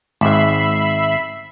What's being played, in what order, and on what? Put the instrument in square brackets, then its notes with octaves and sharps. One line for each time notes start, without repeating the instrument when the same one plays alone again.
[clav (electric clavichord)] G#1 G#2 [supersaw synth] E5 B5 C7